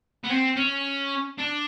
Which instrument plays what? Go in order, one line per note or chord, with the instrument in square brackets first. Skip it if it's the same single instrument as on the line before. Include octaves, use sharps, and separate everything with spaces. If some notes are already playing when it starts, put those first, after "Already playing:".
[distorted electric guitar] B3
C4
C#4
D4